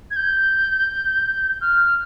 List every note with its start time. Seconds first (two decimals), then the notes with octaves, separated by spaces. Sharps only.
0.11 G#6
0.16 G6
1.61 F6